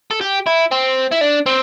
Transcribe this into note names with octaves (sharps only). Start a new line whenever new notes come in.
A4
G4
E4
C4
E4
D4
C4